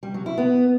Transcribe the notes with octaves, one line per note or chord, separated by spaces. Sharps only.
G3
F#3
E4
B3